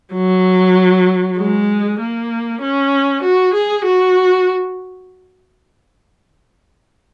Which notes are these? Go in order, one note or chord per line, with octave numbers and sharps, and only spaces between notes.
F#3
G#3
A#3
C#4
F#4
G#4
F#4